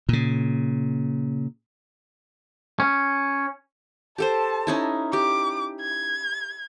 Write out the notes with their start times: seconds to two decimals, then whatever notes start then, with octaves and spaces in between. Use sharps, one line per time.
0.09 A#2 C#3
2.80 C#4
4.18 G4 A4 C5 A5
4.67 C#4 D#4 E4
5.13 G4 D6
5.81 G#6